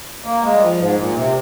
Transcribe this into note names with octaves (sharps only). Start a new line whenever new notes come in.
A#3
G#3
G3
F3
G#2
A#2
C3